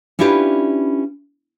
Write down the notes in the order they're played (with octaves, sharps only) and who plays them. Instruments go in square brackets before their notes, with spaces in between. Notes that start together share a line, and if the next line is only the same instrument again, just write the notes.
[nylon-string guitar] C#4 D4 E4 F4 G4 B4